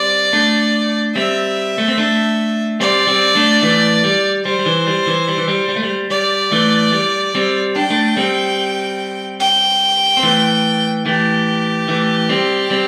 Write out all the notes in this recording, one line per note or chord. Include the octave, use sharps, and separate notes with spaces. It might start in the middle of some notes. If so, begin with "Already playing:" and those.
Already playing: G3 C4 D5
A3 D4
G3 C4 E5
A3
C4
A3 D4
G3 C4 D5
G3 C4
A3 D4
E3 A3
G3
G3 C5
G3
E3
G3
E3
G3
E3
G3
G3
A3
G3
G3 D5
E3 A3
G3
G3 C4
D4 G5
A3 D4
G3 C4
G5
C4
E3 A3
E3 A3 G4
E3 A3
G3 C4
G3 C4